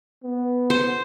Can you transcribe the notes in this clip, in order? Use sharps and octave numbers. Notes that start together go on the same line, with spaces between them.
B3
C5